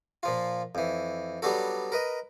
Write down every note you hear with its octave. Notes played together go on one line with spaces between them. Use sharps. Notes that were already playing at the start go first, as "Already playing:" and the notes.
A#2 F3 F4
F2 E3
F#3 G3 B3 D4 F#4 A4
A#4 B4 D#5